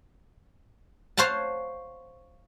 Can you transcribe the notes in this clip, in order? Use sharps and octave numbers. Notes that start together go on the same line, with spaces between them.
C5 C#5 F5 F#5 A5